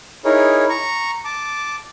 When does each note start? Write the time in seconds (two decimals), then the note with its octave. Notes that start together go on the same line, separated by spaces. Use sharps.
0.25 D#4 E4 G#4 A#4 C#5
0.69 A#5 C#6
1.25 A5 D6